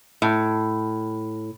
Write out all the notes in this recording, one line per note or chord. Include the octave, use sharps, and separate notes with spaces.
A2